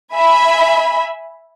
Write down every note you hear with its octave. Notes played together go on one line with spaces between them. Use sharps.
E5 G#5 B5